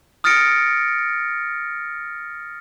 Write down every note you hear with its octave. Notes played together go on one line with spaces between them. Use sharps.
D#6 F6 A6 A#6 C#7 D7